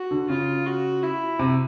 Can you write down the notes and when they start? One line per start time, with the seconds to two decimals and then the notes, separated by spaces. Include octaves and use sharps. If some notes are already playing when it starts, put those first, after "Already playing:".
Already playing: F#4
0.11 D3
0.29 C#3 F4
0.66 F#4
1.03 E4
1.39 C3